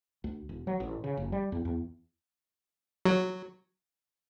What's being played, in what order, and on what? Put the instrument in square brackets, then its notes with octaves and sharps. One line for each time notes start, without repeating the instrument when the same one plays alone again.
[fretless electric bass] D2
E1
F#3
A1
C#3
F#1
G3
E2
E2
[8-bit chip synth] F#3